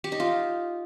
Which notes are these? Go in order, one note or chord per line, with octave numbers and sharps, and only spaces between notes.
G4
D#4
F4